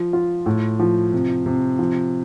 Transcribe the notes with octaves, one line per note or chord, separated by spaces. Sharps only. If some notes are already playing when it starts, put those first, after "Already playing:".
Already playing: F3
F4
A2
F3
C3
C3
F3